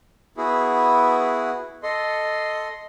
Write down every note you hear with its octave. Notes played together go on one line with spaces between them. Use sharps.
B3 E4 F#4 G#4
A4 D#5 C6